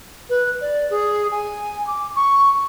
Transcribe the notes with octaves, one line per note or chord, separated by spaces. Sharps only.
B4
D5
G#4
G#5
D6
C#6